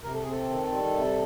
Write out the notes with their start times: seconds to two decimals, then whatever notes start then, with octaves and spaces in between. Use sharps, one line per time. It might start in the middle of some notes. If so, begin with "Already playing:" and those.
0.04 C3 A#4
0.14 A4
0.23 G#4
0.27 C4 A4
0.49 D#3
0.71 G3
0.95 C3